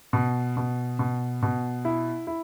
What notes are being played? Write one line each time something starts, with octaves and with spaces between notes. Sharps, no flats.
B2
B2
B2
B2
E4
E4